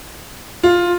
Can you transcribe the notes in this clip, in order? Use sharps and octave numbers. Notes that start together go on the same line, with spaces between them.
F4